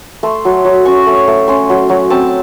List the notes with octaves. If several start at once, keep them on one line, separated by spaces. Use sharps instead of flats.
A3 C6
F#3
F#3
C#4 C#6
A3
A3
C#4 C6
F#3
F#3
C4 A5